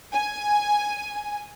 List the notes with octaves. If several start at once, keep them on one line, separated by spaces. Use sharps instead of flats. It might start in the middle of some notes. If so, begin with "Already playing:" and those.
G#5